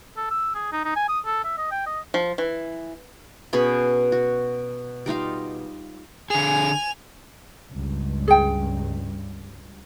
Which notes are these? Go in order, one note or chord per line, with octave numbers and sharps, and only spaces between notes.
A4
E6
G#4
D#4
D#4
G#5
D#6
A4
E5
D#5
G5
D#5
F3
E3
B2 C#4 G#4 B5
F#4
G3 D#4 F4 F5
D3 G#4 G#5 F7
C#2 G2
G#4 G5